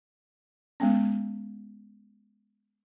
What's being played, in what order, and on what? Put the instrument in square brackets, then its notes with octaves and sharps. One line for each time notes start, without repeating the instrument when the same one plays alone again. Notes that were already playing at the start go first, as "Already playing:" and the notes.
[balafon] G#3 B3 C#4